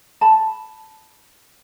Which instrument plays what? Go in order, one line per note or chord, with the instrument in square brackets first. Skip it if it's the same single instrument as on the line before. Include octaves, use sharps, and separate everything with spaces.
[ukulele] A5 B5